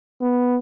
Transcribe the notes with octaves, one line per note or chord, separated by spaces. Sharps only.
B3